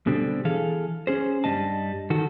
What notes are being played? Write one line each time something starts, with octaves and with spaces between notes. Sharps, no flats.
B2 D3 G3 C4
E3 G#4 A4 F5
C#4 G#4 C5
G2 G3 G#3 D#5 A5
D#3 F#4 A4